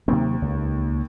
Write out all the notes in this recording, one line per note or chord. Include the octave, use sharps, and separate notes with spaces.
D#2 C3 F#3 C4
C#2